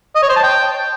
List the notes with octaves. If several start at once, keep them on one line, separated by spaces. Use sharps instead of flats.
D#5
C#5
C5
A5
G5